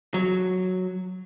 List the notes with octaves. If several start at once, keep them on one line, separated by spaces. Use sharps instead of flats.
F#3